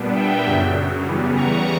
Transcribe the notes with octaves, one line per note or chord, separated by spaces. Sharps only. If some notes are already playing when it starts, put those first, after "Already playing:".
Already playing: A#2 G3 B3 D4
E5 G5
F#2 C#3 F#3
E2 C#3 E3 G3 B3
A#5 C#6